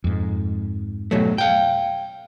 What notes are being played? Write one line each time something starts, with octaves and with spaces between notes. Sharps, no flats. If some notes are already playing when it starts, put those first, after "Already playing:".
F2 G#2
B2 F#3 A3
F5 G5